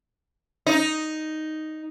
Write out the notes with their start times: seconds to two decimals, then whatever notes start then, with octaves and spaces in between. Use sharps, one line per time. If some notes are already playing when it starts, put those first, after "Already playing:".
0.67 D#4